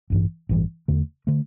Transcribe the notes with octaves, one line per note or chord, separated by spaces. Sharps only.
A1 G2 E3
A1 G2 E3
E2 D3 A3
D3 A3